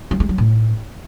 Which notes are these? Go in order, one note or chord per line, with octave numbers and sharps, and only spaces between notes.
F#3
G#3
F#3
A2